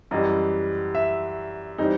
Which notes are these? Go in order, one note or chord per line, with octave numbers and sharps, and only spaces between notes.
F#2 E3 G3 D#5
E5
E3 G3 C4 D#4